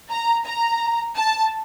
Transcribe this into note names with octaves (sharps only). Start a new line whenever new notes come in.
A#5
A#5
A5